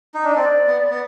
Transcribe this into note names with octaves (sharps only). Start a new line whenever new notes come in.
D#4
D4 D#5
C4 D5
B3
B3